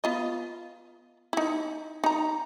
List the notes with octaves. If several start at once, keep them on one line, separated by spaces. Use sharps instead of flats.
B3 F4 D#5
D#4 E4
D#4 A#5